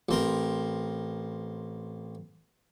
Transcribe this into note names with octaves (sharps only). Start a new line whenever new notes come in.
A1 C4 A#4